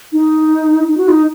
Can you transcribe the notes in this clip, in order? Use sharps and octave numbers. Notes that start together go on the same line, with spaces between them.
D#4
D#4
F#4
D#4